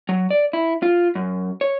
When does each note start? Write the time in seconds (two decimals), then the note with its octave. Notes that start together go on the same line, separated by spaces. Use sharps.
0.09 F#3
0.30 D5
0.53 E4
0.83 F4
1.15 F#2
1.61 C#5